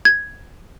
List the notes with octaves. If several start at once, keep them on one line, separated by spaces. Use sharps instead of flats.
G#6